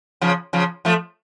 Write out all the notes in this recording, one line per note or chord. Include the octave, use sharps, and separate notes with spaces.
C#3 F3
C#3 F3
F3 A3